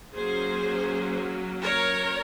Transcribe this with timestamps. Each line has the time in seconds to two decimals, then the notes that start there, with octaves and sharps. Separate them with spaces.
0.16 F#3 A#3 C#4 G#4 C5
1.63 A#4 C#5